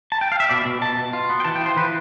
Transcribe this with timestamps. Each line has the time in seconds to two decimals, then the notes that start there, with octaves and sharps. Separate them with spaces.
0.12 A5
0.21 G5
0.32 F5
0.40 E5
0.49 B2 D5
0.65 B2
0.82 B2 A5
0.97 B2
1.13 F4
1.29 B3
1.40 G5
1.45 E3 A5
1.56 G5
1.61 F4
1.66 C5
1.77 E3 B4